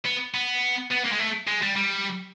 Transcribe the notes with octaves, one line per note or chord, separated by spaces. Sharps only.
B3
B3
B3
A#3
G#3
A3
G#3
G3
G3